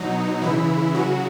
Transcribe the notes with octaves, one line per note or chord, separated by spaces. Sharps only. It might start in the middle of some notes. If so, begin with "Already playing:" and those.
Already playing: B2 F#3 D#4
C#3 E3 E4
C#3 F#3 F#4